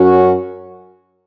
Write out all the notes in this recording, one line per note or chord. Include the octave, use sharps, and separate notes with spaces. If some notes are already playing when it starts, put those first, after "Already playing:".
Already playing: F#2 F#3 C#4 F#4